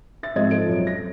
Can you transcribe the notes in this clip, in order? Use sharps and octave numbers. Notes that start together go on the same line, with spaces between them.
E5 A6
G#2 F3 C4 D#5 E5 G#6
F3 A4 D7
F#2
A#6